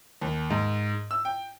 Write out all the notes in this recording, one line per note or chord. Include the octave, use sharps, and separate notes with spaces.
D#2
G#2
E6
G5